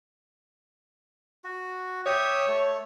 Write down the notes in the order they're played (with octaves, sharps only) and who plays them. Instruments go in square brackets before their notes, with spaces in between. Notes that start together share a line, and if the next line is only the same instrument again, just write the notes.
[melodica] F#4
[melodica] G4 E5 D#6 [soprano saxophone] C#5
[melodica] A3